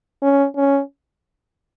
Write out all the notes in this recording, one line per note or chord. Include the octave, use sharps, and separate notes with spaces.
C#4
C#4